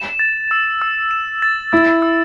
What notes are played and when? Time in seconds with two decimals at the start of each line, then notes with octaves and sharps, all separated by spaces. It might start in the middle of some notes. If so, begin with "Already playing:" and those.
Already playing: E7
0.19 A6
0.51 E6
0.82 E6
1.11 E7
1.42 A6
1.72 E4 E6
2.02 E6